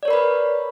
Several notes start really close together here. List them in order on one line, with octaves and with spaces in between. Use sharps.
D5 C#5 A#4 B5 B4